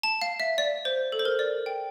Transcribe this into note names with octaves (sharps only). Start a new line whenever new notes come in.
A5
F5
E5
D5
C5
A4
C5
A#4
D5
G5